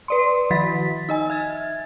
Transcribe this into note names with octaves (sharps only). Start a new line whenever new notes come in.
B4 D5 C6
D#3 F3 B5 A6 B6
D#4 D#5 G#5
E5 G#6 A6